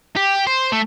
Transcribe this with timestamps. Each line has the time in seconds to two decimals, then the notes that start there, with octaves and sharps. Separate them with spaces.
0.17 G4
0.47 C5
0.72 A3